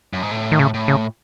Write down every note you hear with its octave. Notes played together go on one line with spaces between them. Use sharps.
F#2
G#2
A2
D#3
C#3
A2
C#3